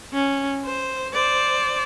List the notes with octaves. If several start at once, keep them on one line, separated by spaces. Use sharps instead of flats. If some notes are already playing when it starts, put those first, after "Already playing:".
C#4
C5
C5 D5